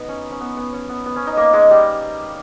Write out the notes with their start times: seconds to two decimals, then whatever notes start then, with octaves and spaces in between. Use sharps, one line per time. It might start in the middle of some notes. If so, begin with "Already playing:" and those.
Already playing: B3 D#4
0.08 C#4
0.31 C#4
0.41 B3
0.57 B3
0.73 C#4
0.89 B3
1.06 B3
1.16 C#4
1.27 D#4
1.37 A#3
1.53 G#3
1.71 G3